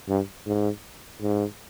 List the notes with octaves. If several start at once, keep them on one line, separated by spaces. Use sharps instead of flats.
G2
G#2
G#2